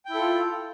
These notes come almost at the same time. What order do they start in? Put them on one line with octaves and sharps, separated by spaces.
G5 E4 A4 F4